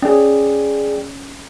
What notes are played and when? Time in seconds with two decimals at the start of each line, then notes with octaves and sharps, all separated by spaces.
0.02 C#4 G#4 D5 G5